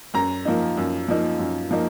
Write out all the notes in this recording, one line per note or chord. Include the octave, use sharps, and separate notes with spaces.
F#2 A#5
F3 A#3 D#4
F#2
F3 A#3 D#4
F#2
F3 A#3 D#4